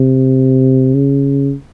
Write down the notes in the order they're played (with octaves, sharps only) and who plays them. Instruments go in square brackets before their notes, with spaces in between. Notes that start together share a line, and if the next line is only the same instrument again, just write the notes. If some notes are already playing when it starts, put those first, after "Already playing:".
Already playing: [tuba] C3
C#3